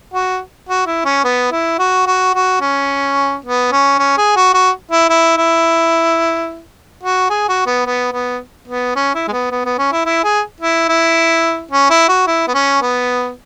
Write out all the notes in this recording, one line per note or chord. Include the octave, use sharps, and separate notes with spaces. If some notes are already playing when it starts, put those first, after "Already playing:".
F#4
F#4
E4
C#4
B3
E4
F#4
F#4
F#4
C#4
B3
C#4
C#4
G#4
F#4
F#4
E4
E4
E4
F#4
G#4
F#4
B3
B3
B3
B3
C#4
E4
G#3
B3
B3
B3
C#4
E4
E4
G#4
E4
E4
C#4
E4
F#4
E4
B3
C#4
B3